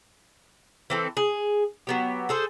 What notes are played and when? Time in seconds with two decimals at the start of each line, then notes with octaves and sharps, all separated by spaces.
0.90 E3 C4 A4
1.17 G#4
1.87 F#3 B3 G4
2.29 G#4 A4 C5